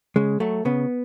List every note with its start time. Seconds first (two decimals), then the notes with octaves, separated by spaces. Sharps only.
0.16 C#3 G#3
0.40 F#3 A3
0.65 C#3 B3